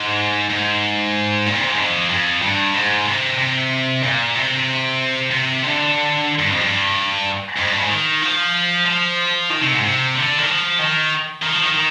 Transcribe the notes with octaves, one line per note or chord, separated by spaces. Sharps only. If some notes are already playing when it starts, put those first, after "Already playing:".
Already playing: G#2
G#2
A#2
C3
G#2
F2
F2
G2
G#2
C3
C3
A#2
C3
C3
D3
G2
F2
G2
F2
G2
G#2
D#3
F3
F3
D#3
C3
G#2
C3
D3
D#3
F3
D#3
D#3
F3
D#3
D#3